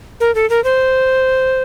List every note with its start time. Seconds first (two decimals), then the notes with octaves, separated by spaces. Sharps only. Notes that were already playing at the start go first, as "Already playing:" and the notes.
0.20 A#4
0.35 A4
0.50 A#4
0.64 C5